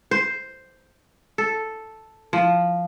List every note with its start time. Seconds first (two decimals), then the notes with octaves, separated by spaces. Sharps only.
0.11 C5
1.38 A4
2.33 F3